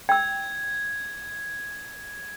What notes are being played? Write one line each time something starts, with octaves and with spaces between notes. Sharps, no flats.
G5 E6 G#6